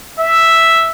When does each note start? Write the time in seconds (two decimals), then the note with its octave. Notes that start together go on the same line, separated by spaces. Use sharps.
0.20 E5